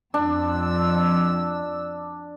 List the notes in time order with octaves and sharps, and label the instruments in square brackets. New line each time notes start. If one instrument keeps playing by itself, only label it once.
[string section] F2 E6 [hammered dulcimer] D4